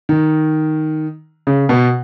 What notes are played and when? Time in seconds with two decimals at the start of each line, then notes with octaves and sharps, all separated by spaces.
0.09 D#3
1.47 C#3
1.69 B2